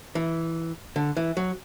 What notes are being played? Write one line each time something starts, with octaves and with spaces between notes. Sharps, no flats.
E3
D3
E3
F#3